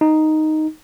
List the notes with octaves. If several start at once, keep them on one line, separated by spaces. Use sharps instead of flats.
D#4